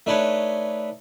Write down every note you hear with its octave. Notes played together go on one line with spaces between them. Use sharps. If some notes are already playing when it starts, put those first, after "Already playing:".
A3 D4 D#4 B4 C#5